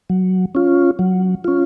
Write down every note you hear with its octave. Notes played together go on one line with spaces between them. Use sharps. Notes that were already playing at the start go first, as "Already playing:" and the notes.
F#3
C#4 F4
F#3
C#4 F4